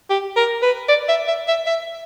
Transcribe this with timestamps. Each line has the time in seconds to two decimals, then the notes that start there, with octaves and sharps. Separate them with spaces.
0.10 G4
0.37 A#4
0.63 B4
0.88 D5
1.09 E5
1.28 E5
1.48 E5
1.67 E5